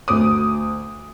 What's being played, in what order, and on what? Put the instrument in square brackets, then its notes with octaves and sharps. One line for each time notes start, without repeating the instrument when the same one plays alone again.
[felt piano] D2 D6 D#6